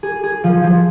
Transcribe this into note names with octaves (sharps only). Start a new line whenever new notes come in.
G#4
G#4
F3
F3